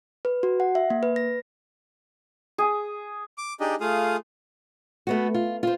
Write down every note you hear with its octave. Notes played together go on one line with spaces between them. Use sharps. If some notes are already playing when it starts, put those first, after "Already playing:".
B4
F#4
F#5
E5
A#3
B4
A#6
G#4
D6
D4 D#4 G4 G#4 D#5
A3 F4 G#4 F5 D#6
A3 B3 F#4
F4
F4 C5